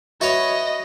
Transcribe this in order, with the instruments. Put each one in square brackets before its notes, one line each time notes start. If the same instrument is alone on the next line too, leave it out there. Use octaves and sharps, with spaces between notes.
[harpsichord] F#4 B4 C#5 [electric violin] D#5 [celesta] E5